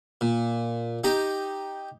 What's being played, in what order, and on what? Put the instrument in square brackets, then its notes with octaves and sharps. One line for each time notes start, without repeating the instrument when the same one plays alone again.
[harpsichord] A#2
D#4 G4 A#5